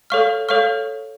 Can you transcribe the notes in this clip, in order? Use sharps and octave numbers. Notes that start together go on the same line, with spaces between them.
A4 C#5 F5 C#6 F6
A4 C#5 F5 C#6 F6